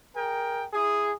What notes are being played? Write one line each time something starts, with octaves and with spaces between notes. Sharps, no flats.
G#4 A#4 G5
E4 G#4